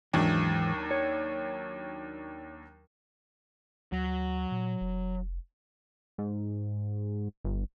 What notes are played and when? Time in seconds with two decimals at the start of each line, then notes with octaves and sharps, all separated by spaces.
0.13 D#2 G#2 E3 F#3 D4
0.91 C#5
3.92 D2 F#3
4.52 A#2
4.81 F1
6.18 G#2
7.44 G1